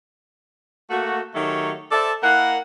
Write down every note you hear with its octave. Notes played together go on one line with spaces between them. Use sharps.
A3 A#3 F#4
D#3 F#3 A3 G4 C#5
A4 C5 D5 E5 A5
A#3 E4 A#4 F#5